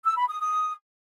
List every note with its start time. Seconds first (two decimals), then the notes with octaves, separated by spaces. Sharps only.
0.04 E6
0.16 B5
0.28 D#6
0.40 D#6